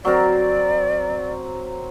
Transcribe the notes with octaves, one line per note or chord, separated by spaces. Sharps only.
F#3 C4 A#4 D5